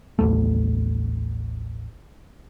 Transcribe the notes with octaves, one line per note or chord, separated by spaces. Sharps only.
A1 D#2 A3